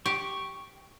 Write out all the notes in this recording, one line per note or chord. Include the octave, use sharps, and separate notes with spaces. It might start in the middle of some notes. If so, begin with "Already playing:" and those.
G4 C#6